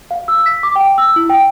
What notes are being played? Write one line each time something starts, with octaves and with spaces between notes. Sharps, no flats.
F5
E6
B6
D6
G5
E6
E4
G5